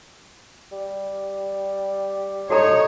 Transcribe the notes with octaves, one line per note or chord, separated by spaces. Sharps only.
G3
D#4 F#4 A4 C#5 A#5